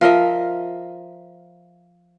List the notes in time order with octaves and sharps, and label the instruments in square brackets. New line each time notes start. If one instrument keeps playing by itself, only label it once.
[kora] F3 A#4 D#5 E5